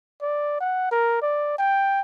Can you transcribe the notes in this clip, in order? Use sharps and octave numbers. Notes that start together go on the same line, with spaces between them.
D5
F#5
A#4
D5
G5